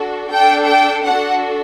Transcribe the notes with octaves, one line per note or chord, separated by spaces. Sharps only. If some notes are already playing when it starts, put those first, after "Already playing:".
Already playing: D4 F#4 A4
D4 A4 G5
G5
D4 F#4 A4 F#5